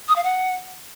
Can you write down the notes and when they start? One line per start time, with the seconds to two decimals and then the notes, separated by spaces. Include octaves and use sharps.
0.08 D#6
0.16 F5
0.24 F#5